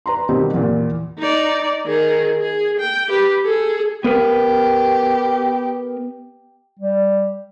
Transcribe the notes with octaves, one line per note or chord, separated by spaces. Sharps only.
B4 A#5 C6
B2 D#3 G3 B3 C4 G4
E2 A#2
D#4 D5
D#3 G#4
G#4
G5
G4 B4
G#4 A4
B3 G4 A#4 B4
G3